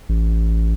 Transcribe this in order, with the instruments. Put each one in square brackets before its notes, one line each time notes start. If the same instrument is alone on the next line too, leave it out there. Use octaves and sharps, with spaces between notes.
[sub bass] A1